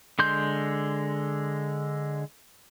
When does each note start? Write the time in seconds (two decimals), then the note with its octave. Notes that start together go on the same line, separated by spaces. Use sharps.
0.19 D3 G#3 C6 G6